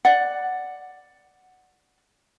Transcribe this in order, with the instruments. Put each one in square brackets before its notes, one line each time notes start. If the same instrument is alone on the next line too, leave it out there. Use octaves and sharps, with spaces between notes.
[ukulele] D5 F#5